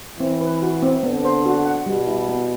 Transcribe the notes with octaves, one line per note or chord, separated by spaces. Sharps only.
E3 C4
B4
F#4
C4
D3 B3
C5
F#4
F#5
B2 G3
E4
B3